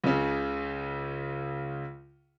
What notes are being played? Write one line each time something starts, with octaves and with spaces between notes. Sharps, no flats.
C#2 C#3